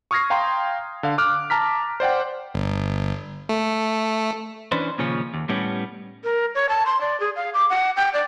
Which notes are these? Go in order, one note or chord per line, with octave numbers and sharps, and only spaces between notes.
C#6 D#6 F6 G#6 A#6 C7
F5 G5 A#5 C6
D3 F5
D6 F6 F#6
A5 A#5 F6 B6
C5 D5 F#5 G5
G1
A3
E3 C#4 D4 B4 C5
D#2 A#2 C#3 F3 C#4
D#2
A2 G3 B3 C#4
A#4
C#5
A5
C6
D5
G#4
F5
D6
F#5
G5
D5